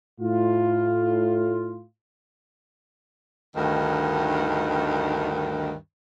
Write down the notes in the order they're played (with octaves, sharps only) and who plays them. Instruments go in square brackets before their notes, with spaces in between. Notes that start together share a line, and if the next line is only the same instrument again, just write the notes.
[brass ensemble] A2 F4
[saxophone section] D2 G2 D#3